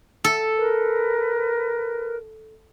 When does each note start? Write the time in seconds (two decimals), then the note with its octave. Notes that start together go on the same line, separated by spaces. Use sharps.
0.24 A4
0.57 A#4 B4